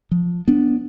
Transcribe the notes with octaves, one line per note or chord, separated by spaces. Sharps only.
F3
B3 D4